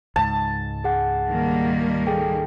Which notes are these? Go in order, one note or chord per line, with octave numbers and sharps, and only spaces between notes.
C#2 G#2 A5
G#4 F#5
D#3 G3 A#3
G#4 A4 G5